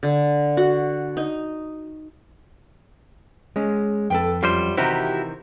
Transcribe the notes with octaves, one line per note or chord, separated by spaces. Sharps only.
D3
F#4
D#4
G#3 C#4
F2 A4 B4 G5
F#2 G3 F4 C5
C3 D#3 E3 E4 F#4 G4 C5 A#5